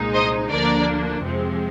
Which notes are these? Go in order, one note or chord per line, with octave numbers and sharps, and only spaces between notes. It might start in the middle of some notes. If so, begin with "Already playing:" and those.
Already playing: C2 A#2 G#3 D#4
C5 D#5
D2 D3 F3 A#3 D4 A#4 D5
F2 C3 F3 G#3 C4